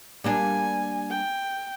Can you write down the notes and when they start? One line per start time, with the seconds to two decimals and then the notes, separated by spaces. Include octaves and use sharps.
0.24 G3 A#3 D4 G#5
1.11 G5